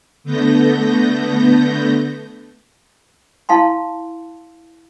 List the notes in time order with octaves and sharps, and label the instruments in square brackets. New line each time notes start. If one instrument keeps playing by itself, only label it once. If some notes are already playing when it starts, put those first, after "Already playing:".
[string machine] D3 A3 B3 G6 A#6
[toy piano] E4 F5 A5 C6